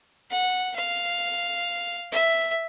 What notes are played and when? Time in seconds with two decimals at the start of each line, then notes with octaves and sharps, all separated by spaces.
0.30 F#5
0.76 F5
2.12 E5